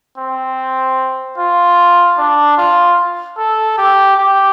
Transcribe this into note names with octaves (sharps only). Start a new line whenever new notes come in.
C4
F4
D4
F4
A4
G4
G4